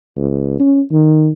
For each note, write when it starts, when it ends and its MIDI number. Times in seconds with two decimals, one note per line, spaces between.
0.17 0.57 37
0.60 0.81 61
0.92 1.31 51